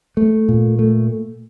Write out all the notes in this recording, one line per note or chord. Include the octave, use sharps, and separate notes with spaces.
A3
A#2
A3